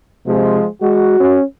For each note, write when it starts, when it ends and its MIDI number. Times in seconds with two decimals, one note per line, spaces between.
0.27 0.60 48
0.27 0.67 53
0.27 0.67 56
0.82 1.16 56
0.82 1.37 66
1.20 1.43 61